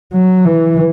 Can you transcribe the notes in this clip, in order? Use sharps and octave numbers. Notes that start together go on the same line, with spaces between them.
F#3
E3